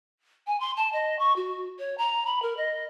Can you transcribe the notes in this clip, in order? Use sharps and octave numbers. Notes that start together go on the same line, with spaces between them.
G#5
C6
A5
D#5
C#6
F#4
C#5
A#5
B5
A#4
D#5